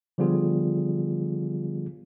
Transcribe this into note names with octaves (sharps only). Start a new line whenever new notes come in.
D3 F3 G3 B3 F4 G#4